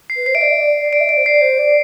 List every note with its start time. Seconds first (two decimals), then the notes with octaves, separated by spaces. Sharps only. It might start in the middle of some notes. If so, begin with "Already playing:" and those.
0.10 C7
0.16 B4
0.26 C5 C7
0.34 E5 D7
0.41 D5 C7
0.51 E5
0.59 D5
0.81 D5
0.92 D5 D7
1.00 E5
1.09 D5 D7
1.17 C5
1.25 D5 C7
1.41 C5
1.58 D5